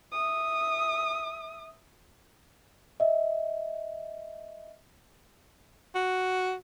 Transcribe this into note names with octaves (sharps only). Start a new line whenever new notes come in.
E5 D#6
D#5 E5
F#4